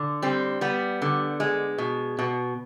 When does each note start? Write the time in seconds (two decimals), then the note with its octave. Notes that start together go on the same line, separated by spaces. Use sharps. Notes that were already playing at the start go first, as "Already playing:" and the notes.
Already playing: D3
0.22 G3 C4
0.61 G3 B3
1.02 D3
1.40 G#3
1.78 B2
2.19 B2